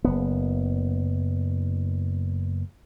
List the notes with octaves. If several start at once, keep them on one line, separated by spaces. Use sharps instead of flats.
F#1 B3